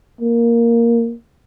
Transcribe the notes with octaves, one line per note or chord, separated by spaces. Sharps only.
A#3